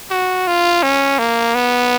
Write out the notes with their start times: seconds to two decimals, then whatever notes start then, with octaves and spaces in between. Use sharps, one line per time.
0.11 F#4
0.47 F4
0.83 C#4
1.18 A#3
1.55 B3